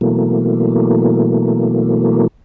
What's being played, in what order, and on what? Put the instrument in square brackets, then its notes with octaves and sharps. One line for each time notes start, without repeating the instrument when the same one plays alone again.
[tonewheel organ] B2 E3 F#3 A3 A#3